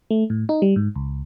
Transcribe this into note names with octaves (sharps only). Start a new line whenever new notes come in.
A3
A2
D#4
G3
G#2
C#2